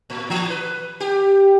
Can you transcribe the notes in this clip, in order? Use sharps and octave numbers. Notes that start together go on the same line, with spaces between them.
A2
E3
B4
G4